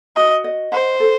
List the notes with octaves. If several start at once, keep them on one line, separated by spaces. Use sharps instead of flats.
F#4 D#5
D#5
C5 F#5
A4